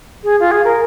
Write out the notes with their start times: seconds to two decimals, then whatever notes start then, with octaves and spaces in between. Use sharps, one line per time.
0.23 G#4
0.39 F4
0.51 G#4
0.64 A#4